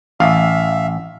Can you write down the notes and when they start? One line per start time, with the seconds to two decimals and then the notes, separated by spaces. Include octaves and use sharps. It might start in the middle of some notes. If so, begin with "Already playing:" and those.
0.20 A1 E5 F5